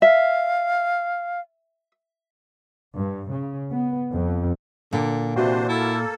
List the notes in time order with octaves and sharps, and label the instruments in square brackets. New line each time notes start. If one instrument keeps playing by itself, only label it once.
[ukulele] E5 [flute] F5
[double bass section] G2
C#3
B3
F2
[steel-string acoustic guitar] A#2 [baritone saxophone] D3
[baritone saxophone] C3 [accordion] E3 D4 C5 [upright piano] F#4
[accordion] A#3 A4 [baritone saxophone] E4